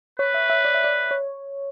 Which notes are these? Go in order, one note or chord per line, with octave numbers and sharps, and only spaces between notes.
B4 C#5
E5
E5
D5
E5
D5
C#5